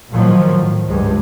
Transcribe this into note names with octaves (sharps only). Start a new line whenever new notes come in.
A#2 D#3 F3 F#3
A2
C#2 G2 G#3